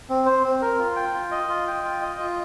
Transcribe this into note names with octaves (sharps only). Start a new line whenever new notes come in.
C4
C5
C4
A#4
F4
G5
F4
D#5
F4
G5
F4
D#5
F4